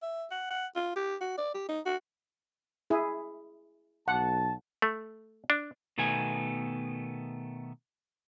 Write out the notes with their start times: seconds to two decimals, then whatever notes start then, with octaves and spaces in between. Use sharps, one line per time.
0.02 E5
0.31 F#5
0.50 F#5
0.76 F4
0.96 G4
1.21 F#4
1.38 D5
1.54 G4
1.68 D#4
1.86 F#4
2.90 E4 G#4
4.08 B1 F#5 A5
4.82 A3
5.50 D4
5.98 B2 D#3 A3 B3 G#5